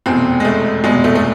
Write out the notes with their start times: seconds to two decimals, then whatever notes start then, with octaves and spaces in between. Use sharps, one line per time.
0.06 F1 E2 B2 C4
0.40 G#3
0.45 A3
0.84 F1 E2 B2 G#3
1.04 A3
1.15 A3